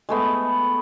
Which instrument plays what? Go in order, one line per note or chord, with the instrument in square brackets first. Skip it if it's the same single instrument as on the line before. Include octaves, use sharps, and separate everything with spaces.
[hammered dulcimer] G#3 A3 B3